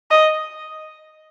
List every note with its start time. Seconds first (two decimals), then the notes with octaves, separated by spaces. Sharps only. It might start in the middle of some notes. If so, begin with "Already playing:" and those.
0.11 D#5